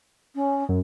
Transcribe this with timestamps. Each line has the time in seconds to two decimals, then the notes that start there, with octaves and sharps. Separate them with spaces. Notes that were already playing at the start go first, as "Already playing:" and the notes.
0.35 C#4
0.69 F#2